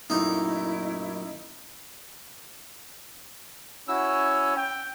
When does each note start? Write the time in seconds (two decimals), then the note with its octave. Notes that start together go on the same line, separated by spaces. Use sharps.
0.10 F#2 A#2 A3 D#4 E4 D#5
3.88 C#4 E4 F#4 E6
4.57 G5